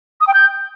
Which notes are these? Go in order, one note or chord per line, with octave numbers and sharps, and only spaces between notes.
D#6
G5
G6